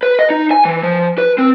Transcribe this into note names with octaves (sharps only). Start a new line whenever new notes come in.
B4
D#5
D#4
G#5
E3
F3
B4
C4